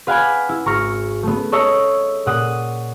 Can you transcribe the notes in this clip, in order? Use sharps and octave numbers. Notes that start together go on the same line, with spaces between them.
B4 F5 F#5 G#5 B5 D6
E4
G#1 A#5 C#6 F6 A#6
A3 B3
A4 C#5 D#5 E5 A#5 C#6
A#2 F#5 D#6 D#7